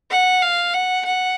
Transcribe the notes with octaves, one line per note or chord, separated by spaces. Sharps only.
F#5
F5
F#5
F#5